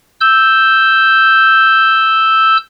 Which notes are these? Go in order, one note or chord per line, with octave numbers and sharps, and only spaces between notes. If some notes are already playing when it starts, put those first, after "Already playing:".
E6 G6